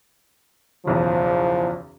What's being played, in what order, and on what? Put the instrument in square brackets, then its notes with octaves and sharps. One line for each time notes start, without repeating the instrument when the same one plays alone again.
[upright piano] F#1 B1 E2 [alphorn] F3